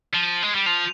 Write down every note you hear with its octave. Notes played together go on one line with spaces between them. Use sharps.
F3 D#7
G#3
G3
F3 F7